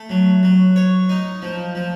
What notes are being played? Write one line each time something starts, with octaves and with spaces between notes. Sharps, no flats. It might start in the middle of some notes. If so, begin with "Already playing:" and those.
Already playing: A3
F#3
F#3
C#5
D#4
F3
F3